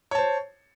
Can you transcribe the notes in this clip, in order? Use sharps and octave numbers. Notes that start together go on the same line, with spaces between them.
C5 C#5 A5